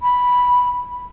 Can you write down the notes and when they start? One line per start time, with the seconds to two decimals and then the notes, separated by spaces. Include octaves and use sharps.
0.02 B5